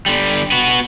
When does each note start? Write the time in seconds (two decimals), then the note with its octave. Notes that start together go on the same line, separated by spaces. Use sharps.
0.06 D3 G3
0.52 B3 F#4